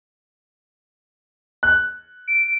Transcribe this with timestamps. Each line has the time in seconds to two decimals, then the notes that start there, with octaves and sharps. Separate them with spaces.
1.63 F#6
2.28 D7